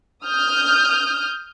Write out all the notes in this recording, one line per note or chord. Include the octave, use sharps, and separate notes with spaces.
D#6 F6 G6